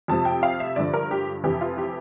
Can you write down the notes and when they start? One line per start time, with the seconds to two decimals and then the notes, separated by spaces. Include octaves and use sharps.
0.08 F2 C3 F3 A5
0.25 G5
0.43 F5
0.60 E5
0.76 G2 D3 F3 D5
0.94 A#4
1.11 G4
1.44 F2 C3 E3 G4
1.61 F4
1.78 G4